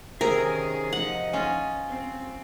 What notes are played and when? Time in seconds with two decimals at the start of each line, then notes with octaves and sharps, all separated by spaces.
0.21 C3 D#3 C#4 G#4 A#4
0.93 F3 D#4 D#5 F#5
1.33 C#4 F4
1.90 C4